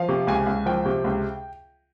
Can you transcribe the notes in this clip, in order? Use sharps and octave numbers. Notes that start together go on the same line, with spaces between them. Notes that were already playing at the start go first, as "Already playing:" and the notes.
Already playing: F3 F5
C3
C#2 G#5
C#2
F3 G5
C3
C#2